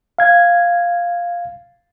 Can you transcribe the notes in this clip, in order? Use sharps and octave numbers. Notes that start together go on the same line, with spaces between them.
F5 G#6